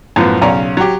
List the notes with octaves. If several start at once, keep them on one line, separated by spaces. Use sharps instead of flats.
F#2 A2 F3 B3
B1 C#3 C#4 D5 A#5
F#3 G4